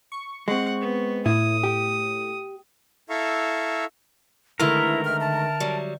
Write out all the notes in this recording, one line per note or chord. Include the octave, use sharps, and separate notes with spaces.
C#6
G#3 C4 F#5
B3
A2 E4 D#6
G4
E4 A4 E5 F5 A#5 C#6
D3 D#3 G#3 A3 E4 A#4 B4
D#5 E5 G5 F6
A5
F#3 G3